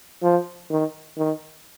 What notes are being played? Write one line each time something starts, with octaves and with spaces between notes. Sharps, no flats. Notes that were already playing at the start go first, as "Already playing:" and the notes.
F3
D#3
D#3